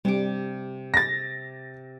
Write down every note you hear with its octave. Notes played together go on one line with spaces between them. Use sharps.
C3 G3 D6
A6 A#6